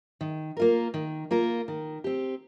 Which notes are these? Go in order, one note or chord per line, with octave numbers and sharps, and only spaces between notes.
D#3
A#3 F4 A#4
D#3
A#3 F4 A#4
D#3
C4 G4